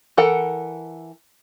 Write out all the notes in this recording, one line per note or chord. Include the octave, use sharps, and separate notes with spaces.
E3 A4 A#4 F#5